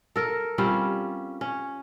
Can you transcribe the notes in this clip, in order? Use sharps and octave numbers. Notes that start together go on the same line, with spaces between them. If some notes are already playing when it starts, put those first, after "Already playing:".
A4 A#4
G3 C4 C#4 F4
C#4